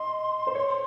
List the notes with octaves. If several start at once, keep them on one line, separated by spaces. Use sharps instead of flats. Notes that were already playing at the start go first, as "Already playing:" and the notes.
Already playing: D#5 C6
C5
C#5